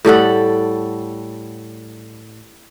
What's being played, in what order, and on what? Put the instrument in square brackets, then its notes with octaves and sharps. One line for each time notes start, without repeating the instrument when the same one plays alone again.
[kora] A2 G3 A4 F#5